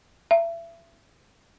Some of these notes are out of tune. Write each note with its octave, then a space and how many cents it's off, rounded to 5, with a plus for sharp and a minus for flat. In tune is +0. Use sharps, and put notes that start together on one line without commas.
E5 +30